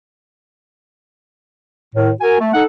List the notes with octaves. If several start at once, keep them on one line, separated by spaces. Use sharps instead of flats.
A2 D#3
F#4 A#4 G#5
A3
D#4 A4 F#5